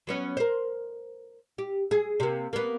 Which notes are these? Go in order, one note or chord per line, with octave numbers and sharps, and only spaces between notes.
F#3 B3 C#4
A#4 C5
G4
G#4
C3 A#3
A#3 B3